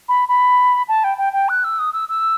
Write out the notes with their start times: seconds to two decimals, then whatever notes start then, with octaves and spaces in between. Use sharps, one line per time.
0.09 B5
0.29 B5
0.89 A5
1.04 G5
1.18 G5
1.33 G5
1.49 F#6
1.64 E6
1.79 D#6
1.93 E6
2.09 E6